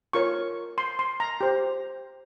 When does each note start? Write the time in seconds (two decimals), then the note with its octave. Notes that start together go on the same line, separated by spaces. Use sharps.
0.13 F4 A#4 C#5 C#6
0.78 C6
0.99 C6
1.20 A#5
1.41 G4 C5